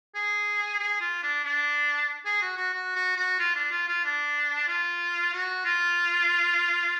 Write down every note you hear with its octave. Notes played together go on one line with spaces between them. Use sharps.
G#4
G#4
F4
D4
D4
G#4
F#4
F#4
F#4
F#4
F#4
F4
D4
F4
F4
D4
F4
F#4
F4